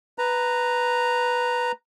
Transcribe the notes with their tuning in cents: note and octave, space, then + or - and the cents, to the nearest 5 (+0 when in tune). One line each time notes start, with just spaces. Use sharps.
B4 +0 A#5 -5